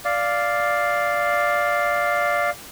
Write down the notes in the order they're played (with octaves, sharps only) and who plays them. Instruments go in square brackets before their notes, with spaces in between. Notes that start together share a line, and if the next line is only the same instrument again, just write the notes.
[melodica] D5 F5